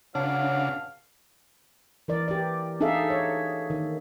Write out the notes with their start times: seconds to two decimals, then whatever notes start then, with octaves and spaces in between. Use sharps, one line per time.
0.15 C#2 C#3 F#3 D4 C#5 F5 F#5 A5
2.08 E3 A#4 D5
2.28 G4 D5
2.80 D4 D#4 G#4 A4 E5 F5
3.10 C#5
3.70 D#3